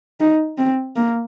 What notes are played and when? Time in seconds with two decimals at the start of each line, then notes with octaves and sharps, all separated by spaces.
0.20 D#4
0.58 C4
0.96 A#3